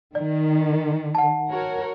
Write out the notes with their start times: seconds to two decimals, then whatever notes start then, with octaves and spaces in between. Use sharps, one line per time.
0.15 D#3 D5
1.15 F#5 A5
1.50 F#4 A#4 C#5